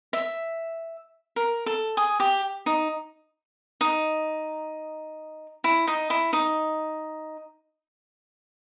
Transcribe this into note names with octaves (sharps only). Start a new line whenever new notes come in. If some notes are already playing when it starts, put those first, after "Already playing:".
E5
A#4
A4
G#4
G4
D#4
D#4
E4
D#4
E4
D#4